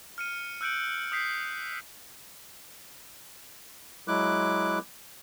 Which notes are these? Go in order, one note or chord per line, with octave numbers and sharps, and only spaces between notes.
F6 C#7 D#7
E6 F#6 G6 C#7 D7 F#7
D#6 G6 B6 C7
F#3 G#3 E4 D6 F#6